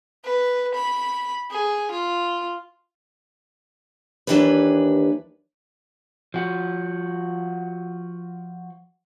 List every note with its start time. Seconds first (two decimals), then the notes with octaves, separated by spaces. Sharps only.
0.24 B4
0.74 B5
1.51 G#4
1.91 F4
4.27 D#2 D#3 E3 D4 G4 B4
6.34 F3 F#4